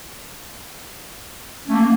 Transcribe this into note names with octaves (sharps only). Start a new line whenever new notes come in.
A3 A#3 C#4